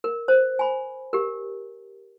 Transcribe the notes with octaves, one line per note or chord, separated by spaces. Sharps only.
A#4
C5
G#5 B5
G4 A#4